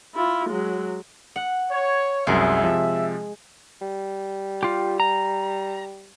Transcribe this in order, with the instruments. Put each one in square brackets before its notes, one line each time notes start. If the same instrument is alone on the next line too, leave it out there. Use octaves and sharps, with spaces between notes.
[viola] E4 F4
F#3 G#3
[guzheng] F#5
[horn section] C#5
[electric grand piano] C2 F#2 [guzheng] G#3 [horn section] E5
[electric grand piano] C3 F3
[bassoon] G3
[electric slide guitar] F4 G4
A#5